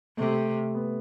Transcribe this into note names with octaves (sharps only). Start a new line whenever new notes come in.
C3 A3
B3